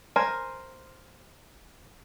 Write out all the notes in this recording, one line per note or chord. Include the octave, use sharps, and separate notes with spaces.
A#4 C5 G#5